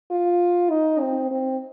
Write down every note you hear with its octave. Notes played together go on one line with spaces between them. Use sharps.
F4
D#4
C4
C4